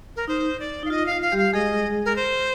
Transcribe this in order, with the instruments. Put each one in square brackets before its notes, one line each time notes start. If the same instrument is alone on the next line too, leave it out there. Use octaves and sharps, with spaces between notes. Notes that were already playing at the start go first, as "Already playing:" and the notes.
[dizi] A#4
[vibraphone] D#4 [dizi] C5
[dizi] D5
[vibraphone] D#4 [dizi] F5
[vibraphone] F4 [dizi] D#5
[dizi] F5
[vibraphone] F4
[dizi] F5
[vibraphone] G3 G4
[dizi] F5
[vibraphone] G#3 G#4 [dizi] D#5
[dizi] A#4
C5